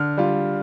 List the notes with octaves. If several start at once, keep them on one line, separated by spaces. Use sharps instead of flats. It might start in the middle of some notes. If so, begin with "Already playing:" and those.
Already playing: D3 F6
G3 F4